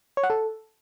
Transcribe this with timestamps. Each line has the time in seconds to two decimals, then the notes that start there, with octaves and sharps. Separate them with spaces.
0.17 C#5
0.23 F#5
0.30 A4